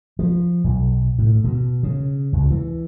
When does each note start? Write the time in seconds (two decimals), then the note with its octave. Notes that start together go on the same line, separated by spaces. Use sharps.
0.19 F3
0.64 B1
1.19 A2
1.44 B2
1.83 C#3
2.33 C#2
2.50 E3